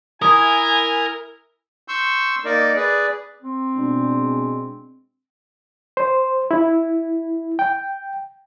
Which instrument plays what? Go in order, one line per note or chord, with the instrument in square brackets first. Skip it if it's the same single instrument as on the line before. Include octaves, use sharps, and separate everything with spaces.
[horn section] E4 G#5 [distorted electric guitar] A#4 [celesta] D#6 G#6
[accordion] C6 C#6 E6 G6
A#3 D#4 A#4 D5
G#4 B4 D5
[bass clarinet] C4
[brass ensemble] B2 G#3 D4
[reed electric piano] C5
E4
G5